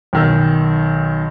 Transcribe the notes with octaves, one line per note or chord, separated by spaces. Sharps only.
B1 D#3 E6